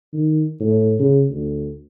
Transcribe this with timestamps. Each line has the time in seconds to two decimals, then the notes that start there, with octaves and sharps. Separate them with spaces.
0.13 D#3
0.60 A2
0.99 C#3
1.30 D2